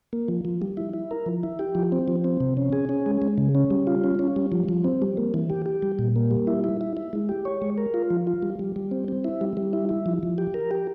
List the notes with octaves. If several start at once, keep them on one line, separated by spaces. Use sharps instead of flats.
A#3
F3
F3
G3
E4
E4
A#4
F3
E4
G4
F3
C4
F3
C4
C3
C#4
G#4
C#4
G#3
G#3
C#3
C#4
G3
F4
C#4
C#4
G3
F3
F3
C4
G3
A#3
E3
G4
G4
G3
A#2
A#3
G3
E4
E4
E4
E4
G#3
G4
C#5
G#3
A#4
F4
F3
F4
G3
G3
G3
C4
C4
E4
G3
G3
E4
E4
F3
F3
G4
A#4
G4